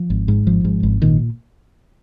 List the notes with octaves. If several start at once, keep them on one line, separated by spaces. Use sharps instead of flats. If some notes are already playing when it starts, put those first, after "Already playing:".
Already playing: F3
G#1
G#2
G#1 F3
G#2
G#1
A#2 D#3